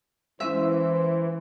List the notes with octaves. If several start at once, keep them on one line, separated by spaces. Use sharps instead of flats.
E3 G#3 C#4 E4 C5 E5